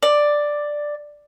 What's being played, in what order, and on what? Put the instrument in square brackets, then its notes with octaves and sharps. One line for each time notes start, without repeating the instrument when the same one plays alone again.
[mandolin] D5